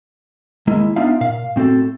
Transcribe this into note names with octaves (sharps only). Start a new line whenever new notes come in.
D#2 G#3 A#3 E4
B3 D4 D#4 F4 E5 F5
A#2 F5
A2 C4 F#4 A4